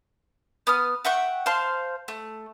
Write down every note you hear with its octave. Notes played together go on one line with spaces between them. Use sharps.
B3 D#6 F6
E5 F#5 G5 C#6
C5 F5 A5 C6
A3